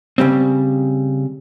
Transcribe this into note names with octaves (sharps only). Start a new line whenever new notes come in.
C#3 G3 C4